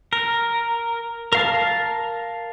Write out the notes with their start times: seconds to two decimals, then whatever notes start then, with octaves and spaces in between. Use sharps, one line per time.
0.13 A#4
1.33 A#4 F5 A5